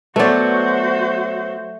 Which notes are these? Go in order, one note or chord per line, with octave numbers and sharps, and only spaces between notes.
F#3 A3 B3 F#4 C5 D5